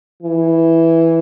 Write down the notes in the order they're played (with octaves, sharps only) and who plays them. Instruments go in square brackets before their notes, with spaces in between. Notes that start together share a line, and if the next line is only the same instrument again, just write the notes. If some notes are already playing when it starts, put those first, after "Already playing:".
[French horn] E3